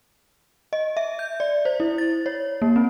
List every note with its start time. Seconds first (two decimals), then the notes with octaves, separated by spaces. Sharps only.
0.73 D#5
0.97 E5
1.19 G6
1.40 D5
1.65 C5
1.80 E4
1.98 A6
2.26 C#5
2.62 A#3
2.76 C4